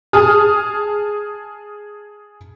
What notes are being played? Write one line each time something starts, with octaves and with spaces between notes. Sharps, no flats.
G#4 G#5 A5 D#6 F6